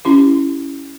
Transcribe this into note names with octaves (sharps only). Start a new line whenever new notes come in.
C#4 E4 G4